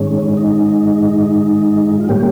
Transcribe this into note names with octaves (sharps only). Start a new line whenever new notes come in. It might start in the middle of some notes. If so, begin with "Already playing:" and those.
Already playing: G#2 D#3 G#3 C#4
D#4
F4
A#2 G3 A#3 C#4 G4